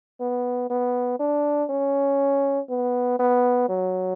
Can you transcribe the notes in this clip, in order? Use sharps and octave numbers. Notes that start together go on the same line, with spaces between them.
B3
B3
D4
C#4
B3
B3
F#3